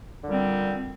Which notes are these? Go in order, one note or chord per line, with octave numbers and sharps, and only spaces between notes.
A#2 D3 G3 C4